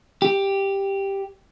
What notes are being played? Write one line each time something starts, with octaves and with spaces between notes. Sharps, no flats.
G4